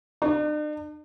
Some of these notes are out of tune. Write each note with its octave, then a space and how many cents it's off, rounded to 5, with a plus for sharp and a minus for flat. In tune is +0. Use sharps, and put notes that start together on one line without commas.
D4 +45